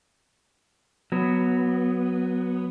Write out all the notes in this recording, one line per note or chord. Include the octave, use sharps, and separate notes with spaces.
F#3 B3